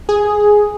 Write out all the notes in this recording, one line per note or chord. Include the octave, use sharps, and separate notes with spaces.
G#4